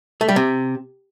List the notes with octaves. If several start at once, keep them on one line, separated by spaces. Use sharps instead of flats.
A3
G3
C3